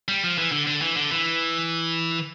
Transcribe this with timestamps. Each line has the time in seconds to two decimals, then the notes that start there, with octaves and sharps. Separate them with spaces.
0.08 G3
0.24 F3
0.38 E3
0.52 D3
0.67 D3
0.82 E3
0.96 D3
1.12 E3